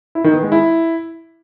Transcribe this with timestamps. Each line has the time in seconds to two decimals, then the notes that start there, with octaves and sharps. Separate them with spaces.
0.15 E4
0.24 D#3
0.33 B3
0.43 G#3
0.52 E4